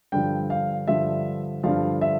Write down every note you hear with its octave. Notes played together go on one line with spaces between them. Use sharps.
G2 D3 F3 G5
F5
G2 D3 F3 E5
G2 D3 F3 F5
E5